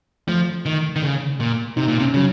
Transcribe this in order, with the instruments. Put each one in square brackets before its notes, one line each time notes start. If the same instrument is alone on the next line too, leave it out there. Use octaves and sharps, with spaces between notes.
[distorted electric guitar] F3 [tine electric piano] A3
[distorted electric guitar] D#3
D#3
C#3
A#2
[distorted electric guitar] C3 [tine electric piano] D#4
[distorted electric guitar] A#2
C3
[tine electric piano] C#4
[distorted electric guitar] C#3 [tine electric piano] F#3